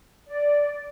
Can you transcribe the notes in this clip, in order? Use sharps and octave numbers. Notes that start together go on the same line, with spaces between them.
D5